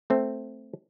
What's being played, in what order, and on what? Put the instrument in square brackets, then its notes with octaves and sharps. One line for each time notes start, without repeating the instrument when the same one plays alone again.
[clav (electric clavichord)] A3 C4